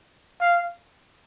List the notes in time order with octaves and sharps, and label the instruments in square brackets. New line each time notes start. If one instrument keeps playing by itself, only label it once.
[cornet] F5